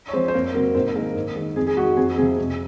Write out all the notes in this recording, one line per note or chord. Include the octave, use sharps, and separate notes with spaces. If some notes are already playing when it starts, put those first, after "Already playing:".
C#5
F3 G#3 C4 C5
C5
F2 A#3 A#4
C3 F#3 A#3 A#4
G#2 C4 C5
D#3 G#3 A#3 A#4
G#2
D#3 G#3
F2 G#4
G#4
D#3 G#3 F#4
F2 G#4
C3 F3 G#4
F2